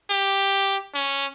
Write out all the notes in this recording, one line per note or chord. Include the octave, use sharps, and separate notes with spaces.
G4
C#4